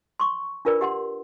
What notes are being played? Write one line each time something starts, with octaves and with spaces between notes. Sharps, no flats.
C6 C#6
D4 F4 A#4 B4 D5
G4 F#5 C6